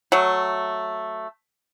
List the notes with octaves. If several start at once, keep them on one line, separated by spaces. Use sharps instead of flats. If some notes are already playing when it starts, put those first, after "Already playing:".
F#3 A3